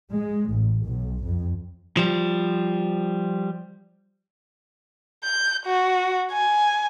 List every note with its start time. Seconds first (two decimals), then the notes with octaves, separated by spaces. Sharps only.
0.14 G#3
0.52 A1
0.86 B1
1.24 F2
1.97 F3 G3
5.24 G6
5.66 F#4
6.32 G#5